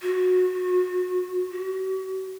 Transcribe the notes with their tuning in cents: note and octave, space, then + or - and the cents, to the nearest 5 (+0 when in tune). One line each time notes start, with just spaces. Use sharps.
F#4 -25
F#4 +40